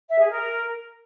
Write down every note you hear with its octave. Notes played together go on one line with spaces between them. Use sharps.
E5
G#4
A#4